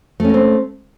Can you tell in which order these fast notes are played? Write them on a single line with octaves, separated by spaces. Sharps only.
A3 C#4 A#3 C4